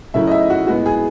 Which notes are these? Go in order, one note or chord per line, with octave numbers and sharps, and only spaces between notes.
C#3 F#3 A3 C#4 E4 E5
D#5
E5
F#4
A2 G#3 B3 F#4
G#4